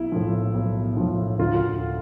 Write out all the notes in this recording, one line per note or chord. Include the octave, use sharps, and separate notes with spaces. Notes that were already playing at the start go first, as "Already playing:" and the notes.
Already playing: B1 E4
A2 F3
B1
A2 F3
D2 F4